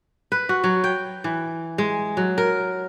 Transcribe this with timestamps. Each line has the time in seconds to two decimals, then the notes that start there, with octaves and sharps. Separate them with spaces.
0.32 B4
0.49 F#4
0.64 F#3
0.84 G5
1.24 E3
1.78 G#3
2.17 F#3
2.38 A#4